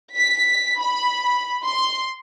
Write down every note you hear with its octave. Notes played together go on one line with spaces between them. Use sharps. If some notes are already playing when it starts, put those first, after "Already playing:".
B6
B5
C6